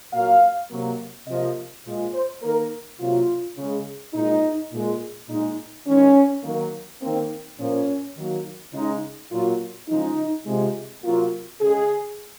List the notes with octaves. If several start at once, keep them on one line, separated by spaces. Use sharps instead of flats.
A#2 F#3 A#3 F5
C3 F#3 A#3
C3 F3 A#3 D#5
A#2 F3 G#3
C5
D#3 A#3 A#4
C3 F#3 A#3 F4
C#3 G#3
A#2 G#3 D#4
A#2 G#3
A#2 G#3 D#4
D#3 G#3 C#4
D#3 F#3 A#3
D#3 A#3 C4
A#2 F3 A#3 C#4
D#3 F#3 A#3
C#3 G#3 D#4
A#2 F#3 A#3 F4
C#3 F3 G#3 D#4
C3 F3 G#3
C3 F#3 A#3 F4
C#3 G#3 G#4